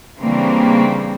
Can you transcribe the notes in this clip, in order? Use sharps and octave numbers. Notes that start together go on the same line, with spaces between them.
C#3 E3 G3 A#3 C4 D4